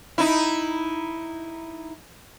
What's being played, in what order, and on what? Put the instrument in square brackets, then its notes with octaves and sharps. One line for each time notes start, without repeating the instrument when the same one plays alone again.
[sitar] D#4 E4